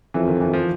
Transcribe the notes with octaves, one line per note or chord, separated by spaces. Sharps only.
F2 E3
D#3
E3
F3